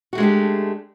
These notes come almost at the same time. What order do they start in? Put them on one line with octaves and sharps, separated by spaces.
F#4 A3 G#3 D4 G4